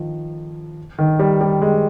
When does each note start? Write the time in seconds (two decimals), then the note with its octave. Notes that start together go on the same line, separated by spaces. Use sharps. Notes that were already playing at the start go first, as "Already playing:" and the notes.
Already playing: D#3 F3
0.99 D#3
1.19 G3
1.41 G3
1.62 G#3